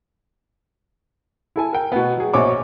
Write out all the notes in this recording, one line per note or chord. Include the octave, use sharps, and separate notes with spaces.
E4 A4 G#5
A#4 G5
B2 B3
F#3 G#4
A#1 B2 C5 C#5 G#5 D6